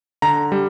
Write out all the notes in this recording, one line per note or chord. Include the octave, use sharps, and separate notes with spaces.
D3 A#5
G3